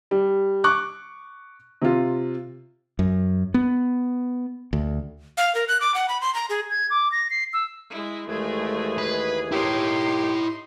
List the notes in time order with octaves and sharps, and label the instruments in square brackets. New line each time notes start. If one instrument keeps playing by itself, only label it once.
[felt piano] G3
C#6 D6 F#6
C3 F4
[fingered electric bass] F#2
B3
D2
[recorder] F5
A#4
F#6
D6
F#5
B5
C6
A#5
G#4
[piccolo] G#6
D6
A#6
C7
E6
[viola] G#3 E4
[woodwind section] D#2 E3 G#4 [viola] G#3 A3
[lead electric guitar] B4
[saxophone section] A#3 G4 [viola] D#4 C6 [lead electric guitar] E4 C#5